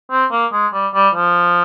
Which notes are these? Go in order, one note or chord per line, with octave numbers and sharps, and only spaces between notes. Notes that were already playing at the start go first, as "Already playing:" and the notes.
C4
A#3
G#3
G3
G3
F3